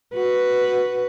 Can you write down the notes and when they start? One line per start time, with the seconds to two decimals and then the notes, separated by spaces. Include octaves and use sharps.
0.15 F#4 B4